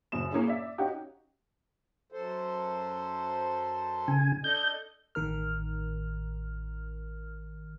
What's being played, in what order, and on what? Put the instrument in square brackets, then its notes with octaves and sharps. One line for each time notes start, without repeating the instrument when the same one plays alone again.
[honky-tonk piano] F#1 F#2 E7
A#3 C#4 E4 G#4
D5 E5
C#4 D#4 F#4 G4
[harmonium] F#2 A4 C5
[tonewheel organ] C#3 G#5
[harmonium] D4 A4 D#5 [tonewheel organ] G6
[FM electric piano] A1 D#3 A#4 F6